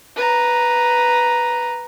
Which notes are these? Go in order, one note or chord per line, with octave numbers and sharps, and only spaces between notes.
B4 A#5